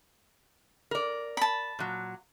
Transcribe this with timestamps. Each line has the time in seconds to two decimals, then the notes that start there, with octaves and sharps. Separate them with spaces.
0.91 A#4 D5
1.37 A5 B5
1.79 A#2 F#3